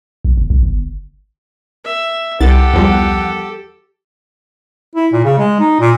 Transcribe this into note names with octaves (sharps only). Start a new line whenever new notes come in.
A#1
G1
B1
G1
E5
C2 G4 A4 F#5 A6
E2 F3 G3
E4
A#2
C#3
G#3
D#4
A#2